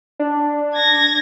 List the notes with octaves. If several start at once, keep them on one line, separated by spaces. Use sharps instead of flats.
D4
G#6 A#6